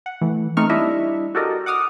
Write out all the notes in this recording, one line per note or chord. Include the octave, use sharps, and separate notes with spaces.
F#5
E3 A3
A3 C4 D#4 A#4 C#6 F6
G3 D4 E4 D#5 E5
F#4 G4 A4 A#4 D5 D#5
F#5 D6 D#6 F6